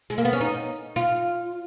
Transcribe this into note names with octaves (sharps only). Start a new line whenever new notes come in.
G#3
A#3
B3
C#4
D#4
F4